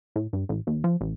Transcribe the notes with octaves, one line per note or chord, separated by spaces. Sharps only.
A2
G2
A1
D#2
F3
A1